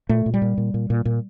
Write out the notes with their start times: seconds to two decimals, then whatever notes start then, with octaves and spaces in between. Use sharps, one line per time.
0.09 A#2 A3
0.26 A#2
0.34 G3
0.42 A#2
0.58 A#2
0.74 A#2
0.90 A#2
1.05 A#2